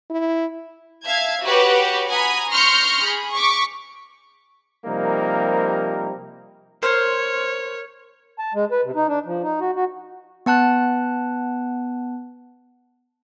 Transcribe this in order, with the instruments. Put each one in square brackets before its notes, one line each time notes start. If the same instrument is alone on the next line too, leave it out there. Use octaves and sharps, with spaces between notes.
[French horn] E4
[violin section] E5 F5 A5 G#6
F#4 G4 B4 C#5
F#5 G#5 A#5 B5 D#6
C6 C#6 F6 G6 A#6 C#7
G#4 B5
C#6 D6 B6
[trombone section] C3 F3 G3 A#3 D#4 A#4
[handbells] A#4 F6 [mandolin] C5 [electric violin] C#5
[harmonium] A5
G#3
B4
C3
D#4
D4
F3
D#4
F#4
F#4
[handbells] B3 F#5 A5 F#6